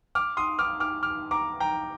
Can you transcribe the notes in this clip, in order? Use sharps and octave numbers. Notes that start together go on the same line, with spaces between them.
D6 F6
C6 D#6
D6 F6
D6 F6
D6 F6
A#5 D6
G5 A#5